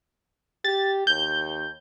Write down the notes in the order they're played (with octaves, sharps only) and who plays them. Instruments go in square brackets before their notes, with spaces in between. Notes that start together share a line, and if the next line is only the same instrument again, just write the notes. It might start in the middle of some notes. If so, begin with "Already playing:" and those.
[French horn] G4 [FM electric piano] A6
[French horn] D#2 [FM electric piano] G6